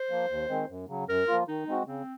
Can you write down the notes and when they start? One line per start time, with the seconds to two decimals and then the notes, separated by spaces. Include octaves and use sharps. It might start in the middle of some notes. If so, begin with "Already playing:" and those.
Already playing: C5
0.10 F3 A#3
0.30 D#2
0.49 D#3 G#3 C4
0.69 F#2
0.89 C#3 F#3
1.08 F#2 A#4
1.28 F3 A#3 F4
1.48 D#3 D#4
1.68 G#3 C4 F#4
1.87 C#3 C4